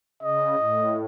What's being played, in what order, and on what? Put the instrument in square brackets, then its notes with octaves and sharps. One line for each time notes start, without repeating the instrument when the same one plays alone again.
[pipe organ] C#3 [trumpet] D#5
[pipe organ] A2